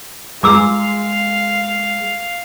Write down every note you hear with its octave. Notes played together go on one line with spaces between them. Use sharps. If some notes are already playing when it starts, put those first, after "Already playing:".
G#3 F4 G#4 F5 A#5 D6 E6